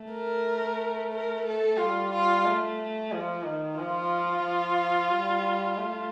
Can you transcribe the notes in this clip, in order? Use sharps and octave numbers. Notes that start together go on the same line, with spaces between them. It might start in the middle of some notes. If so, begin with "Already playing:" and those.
Already playing: A3
A#4
A#4
A4
G3 F4
F4
A3
F3
D#3
F3 F4
F3
G3
A3